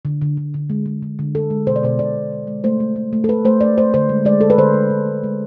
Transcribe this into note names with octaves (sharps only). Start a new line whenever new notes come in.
D3
D3
D3
D3
G#3
G#3
D3
D3
G#3 A4
G#3
B2 C5
D5
B2 C5
B2 D5
B2
G#3
G#3
A3 C5
A3
A3
A3
A4
A3 B4
A3 C5
A3 D5
A3 C5
D3 C5
G#3
G#3 D5
D3 A4
B4
D3 C5
G#3
D3
G#3
G#3